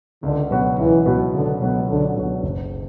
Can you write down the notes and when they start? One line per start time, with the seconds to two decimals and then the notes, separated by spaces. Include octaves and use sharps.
0.23 C#2 D3
0.51 B2 F#3 B3 F#4
0.78 C#2 E3
1.06 B2 F#3 B3 F#4
1.34 C#2 D3
1.61 B2 F#3 B3 F#4
1.88 C#2 D3
2.16 B2 F#3 B3 F#4
2.43 F#1